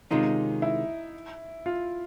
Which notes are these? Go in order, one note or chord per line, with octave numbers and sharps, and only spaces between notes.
C3 D#3 G#3 C#4 D#4 F4
E4
F4